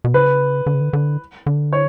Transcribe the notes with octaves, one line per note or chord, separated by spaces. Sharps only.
B2
C#3 B4
D3
C#3
D3
D3
D3
C#5